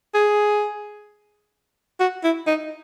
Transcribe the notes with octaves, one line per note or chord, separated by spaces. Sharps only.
G#4
F#4
E4
D#4